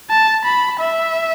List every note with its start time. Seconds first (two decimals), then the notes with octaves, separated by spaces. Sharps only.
0.10 A5
0.45 B5
0.80 E5